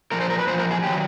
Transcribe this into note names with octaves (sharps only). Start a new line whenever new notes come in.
A#2 F3 A#4
C5
A#4
B4
A#2 F3 C5
A#4
G#4
D#3 F#3 G4